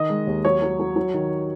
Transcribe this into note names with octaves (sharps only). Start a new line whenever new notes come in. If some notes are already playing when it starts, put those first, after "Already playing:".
Already playing: D#3 D#5
G#3
D#2
F#3 C#5
F#3
F#3
F#3
D#3